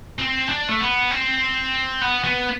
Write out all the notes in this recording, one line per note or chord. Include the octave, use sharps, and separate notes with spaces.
C4
D4
A3
B3
C4
B3
B3